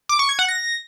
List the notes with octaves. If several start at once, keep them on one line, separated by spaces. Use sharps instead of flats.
D6
C#6
G#6
F#5
A#6